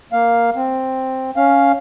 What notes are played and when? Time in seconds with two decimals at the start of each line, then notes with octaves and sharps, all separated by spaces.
0.13 A#3 F5
0.56 C4
1.37 C#4 F5